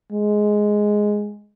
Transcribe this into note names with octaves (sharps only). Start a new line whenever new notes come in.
G#3